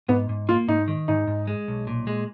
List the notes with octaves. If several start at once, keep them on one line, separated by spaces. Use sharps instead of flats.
G#2 B3
G#2
A#3 F4
G#2 D#4
D#3
G#2 D#4
G#2
G#3
B1
A#2
G#3